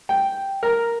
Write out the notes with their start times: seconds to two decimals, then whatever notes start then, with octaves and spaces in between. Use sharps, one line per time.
0.09 G5
0.63 A#4